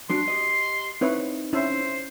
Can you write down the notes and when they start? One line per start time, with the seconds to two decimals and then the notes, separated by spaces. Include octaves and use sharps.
0.10 G3 D4 F#4 C6
0.28 G4 D#5
1.01 C4 D#4 E4 B4 C#5
1.53 C#4 E4 C5 E5